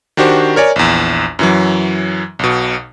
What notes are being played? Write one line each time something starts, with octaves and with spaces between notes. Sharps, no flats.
D#3 D4 F#4 G4 C5
A#4 C#5 D5 G#5
A#1 E2
F#2 E3 F#3
B1 B2